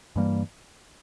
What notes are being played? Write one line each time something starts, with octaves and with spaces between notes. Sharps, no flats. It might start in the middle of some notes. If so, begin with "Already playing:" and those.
G2 E3 G3 A#3